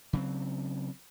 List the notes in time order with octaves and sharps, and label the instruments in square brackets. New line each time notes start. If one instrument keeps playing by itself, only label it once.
[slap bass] C#3 F#3 C4